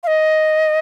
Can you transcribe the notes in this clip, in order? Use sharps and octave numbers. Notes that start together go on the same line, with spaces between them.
F5
D#5